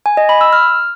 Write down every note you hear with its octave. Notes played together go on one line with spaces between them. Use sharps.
G#5
D#5
B5
E6
F6